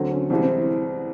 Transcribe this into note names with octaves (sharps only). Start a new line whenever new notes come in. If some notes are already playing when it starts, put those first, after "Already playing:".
Already playing: D2 D3 F#3 C4
C#4
C2 C3 E3 G#3 C4
C4